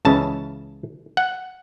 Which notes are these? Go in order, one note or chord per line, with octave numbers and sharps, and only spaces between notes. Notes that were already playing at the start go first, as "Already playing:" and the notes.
C#2 C#3 E3 C#4 E4 A5
F#5